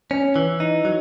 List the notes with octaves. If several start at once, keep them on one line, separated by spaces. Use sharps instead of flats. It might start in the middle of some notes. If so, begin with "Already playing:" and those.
C#4
E3
D#4
F#3